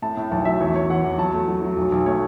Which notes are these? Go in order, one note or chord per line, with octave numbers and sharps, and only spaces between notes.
A2 A5
A2
B1 A5
F#3 E5
E2 C#5
E2 C#5
E3 F#5
E2
F#3 A5
A3
F#3
F#3
B1
B1
A3 C#5